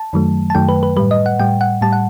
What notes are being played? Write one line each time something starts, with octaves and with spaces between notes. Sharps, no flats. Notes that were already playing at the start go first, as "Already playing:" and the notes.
Already playing: A5
F#2 D#3 F#3 A3
A5
F#2 D#3 F#3 A3 G5
B4
B4
A2 G3 B4
D#5
F#5
A2 G3 G5
F#5
A2 G3 A5
F#5